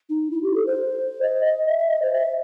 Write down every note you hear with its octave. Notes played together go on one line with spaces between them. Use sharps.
D#4
E4
G4
A4
C5
D#5
D#5
E5
E5
D#5
C5
E5